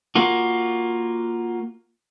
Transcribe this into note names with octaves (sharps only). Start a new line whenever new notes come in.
A#3 F4 F#4